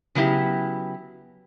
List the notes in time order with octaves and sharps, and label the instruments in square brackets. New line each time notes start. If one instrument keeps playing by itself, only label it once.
[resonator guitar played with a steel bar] C#3 F#3 B3 E4 G4